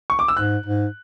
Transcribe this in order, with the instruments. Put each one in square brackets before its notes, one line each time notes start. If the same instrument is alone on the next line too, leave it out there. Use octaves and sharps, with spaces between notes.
[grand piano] C#6
D6
E6
[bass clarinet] G#2 [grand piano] F#6
[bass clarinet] G#2